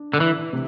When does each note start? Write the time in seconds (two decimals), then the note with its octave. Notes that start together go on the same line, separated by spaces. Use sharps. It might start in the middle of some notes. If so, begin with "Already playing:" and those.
Already playing: D4
0.13 D3
0.20 E3
0.53 C3